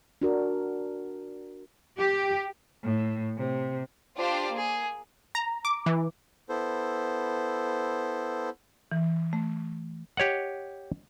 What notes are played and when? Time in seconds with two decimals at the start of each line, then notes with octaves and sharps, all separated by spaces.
0.22 D4 F#4 A#4
1.98 G4
2.83 A2
3.38 C3
4.16 D4 F4 G4 C5 D5 F5
4.51 A#3 G#4
5.35 A#5
5.65 D6
5.86 E3
6.49 B3 E4 A4 C5
8.91 E3
9.33 A3
10.17 G4 C#5 D#5 F#5